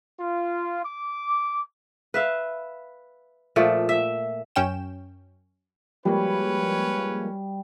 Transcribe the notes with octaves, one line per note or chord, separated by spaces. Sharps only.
F4
D6
B4 E5 F5
A#2 F3 A3
E5
F#2 C#4 G5 E7
F3 G3 G#3 A#3 C#4 B4 C#5